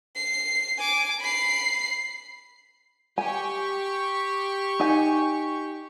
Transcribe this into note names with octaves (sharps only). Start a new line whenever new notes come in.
C7
G#5 D6
B5 C7
G4 G#5 C#6
D#4 G#5